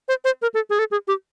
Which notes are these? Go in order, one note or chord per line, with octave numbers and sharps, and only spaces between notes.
C5
C5
A#4
A4
G#4
A4
G#4
G4